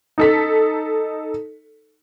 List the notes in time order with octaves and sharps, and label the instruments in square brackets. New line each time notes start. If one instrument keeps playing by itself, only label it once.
[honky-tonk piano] D#4 A4 B6